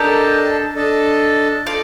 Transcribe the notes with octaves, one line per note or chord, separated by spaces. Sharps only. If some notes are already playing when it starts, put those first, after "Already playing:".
Already playing: D4 G4 A4 A#4 D#5 A5
D4 A4 D#5 A5
F4 A4 D5 D#5 F5